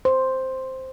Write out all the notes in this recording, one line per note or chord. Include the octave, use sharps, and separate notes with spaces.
C5